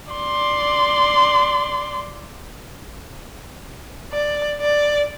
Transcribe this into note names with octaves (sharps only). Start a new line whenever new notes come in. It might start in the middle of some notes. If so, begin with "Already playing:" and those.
D5 C6
D5
D5